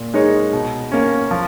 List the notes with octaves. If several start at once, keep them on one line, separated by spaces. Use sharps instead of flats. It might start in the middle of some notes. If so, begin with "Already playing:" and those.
Already playing: A#2
G#3 D#4 A#4 C#5
B2
A#3 C#4
F3